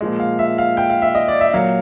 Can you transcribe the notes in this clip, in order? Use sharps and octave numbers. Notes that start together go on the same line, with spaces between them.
A#2 F3 G#3
F5
E5
F5
G5
F5
E5
D#5
D5
E5
A#2 F#3 F5